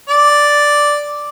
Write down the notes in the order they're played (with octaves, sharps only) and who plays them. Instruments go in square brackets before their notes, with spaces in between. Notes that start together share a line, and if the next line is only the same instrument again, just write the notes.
[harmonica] D5